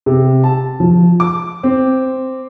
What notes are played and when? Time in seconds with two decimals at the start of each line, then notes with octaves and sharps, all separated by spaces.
0.06 C3
0.44 A5
0.80 F3
1.20 D6
1.63 C4